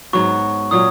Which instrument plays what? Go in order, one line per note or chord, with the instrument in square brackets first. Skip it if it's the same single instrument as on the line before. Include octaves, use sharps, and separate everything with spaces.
[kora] G#2 F#3 B3 F#4 [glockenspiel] C#6
[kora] A#2 F#3 C#4 [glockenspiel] D#6